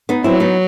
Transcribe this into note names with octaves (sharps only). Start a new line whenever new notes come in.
B3 D#4
F#3 C4 E4
B3 D#4